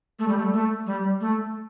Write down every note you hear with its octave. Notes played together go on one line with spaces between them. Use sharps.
A3
G3
A3
A3
G3
A3